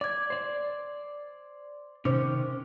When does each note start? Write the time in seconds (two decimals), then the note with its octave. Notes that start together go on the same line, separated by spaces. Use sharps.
0.01 D5 D6 G#6
0.30 C5 D5
2.05 C3 D#3 C#4 C5 D6